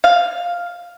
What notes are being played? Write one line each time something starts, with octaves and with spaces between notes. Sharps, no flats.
F5